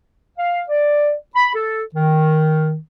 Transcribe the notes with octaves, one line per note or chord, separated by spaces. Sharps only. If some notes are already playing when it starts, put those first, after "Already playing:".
F5
D5
B5
A4
D#3